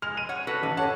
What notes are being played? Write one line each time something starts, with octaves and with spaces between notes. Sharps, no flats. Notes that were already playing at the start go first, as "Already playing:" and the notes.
G#3 F6 F7
F6 D#7
C#5 F#5
F#4 A4 B4
A1 A3 G4
A4 C#5 F#5 A5